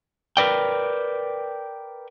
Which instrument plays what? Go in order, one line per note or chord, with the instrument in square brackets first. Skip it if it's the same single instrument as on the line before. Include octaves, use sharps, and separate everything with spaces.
[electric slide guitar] A#4 B4 D5 G5